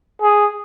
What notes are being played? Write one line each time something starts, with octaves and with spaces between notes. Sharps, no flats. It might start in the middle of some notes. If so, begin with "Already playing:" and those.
G#4